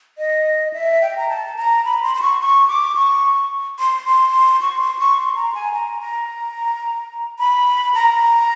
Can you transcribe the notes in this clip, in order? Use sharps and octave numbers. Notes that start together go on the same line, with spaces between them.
D#5
E5
G5
A#5
A5
A#5
B5
C6
C6
C#6
C#6
D6
C#6
C6
C6
C#6
C6
C#6
C6
A#5
G#5
A#5
A#5
B5
A#5